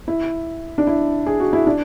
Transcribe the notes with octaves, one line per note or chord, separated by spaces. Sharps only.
E4
D4
E4
G#4
F#4
E4
D4